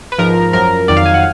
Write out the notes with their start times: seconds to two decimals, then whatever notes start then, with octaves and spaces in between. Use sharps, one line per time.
0.12 B4
0.18 G#2 F3 A#4
0.53 F#2 F3 A#4
0.88 F2 D#3 F#3 D5
0.97 F5
1.06 G#5
1.14 F#5